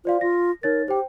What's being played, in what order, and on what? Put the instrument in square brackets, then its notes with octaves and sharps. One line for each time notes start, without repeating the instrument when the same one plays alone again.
[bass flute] F4 [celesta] C5 D5 F5
[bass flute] F4 [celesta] A#6
[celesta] D#4 C#5 A6 [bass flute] A#4
[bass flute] G4 [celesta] C5 G5